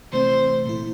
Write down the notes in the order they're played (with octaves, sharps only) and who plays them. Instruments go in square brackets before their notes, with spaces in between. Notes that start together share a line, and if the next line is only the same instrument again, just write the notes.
[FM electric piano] C3 E3 A3 C4 [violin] C5
[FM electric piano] A#2 A3 E4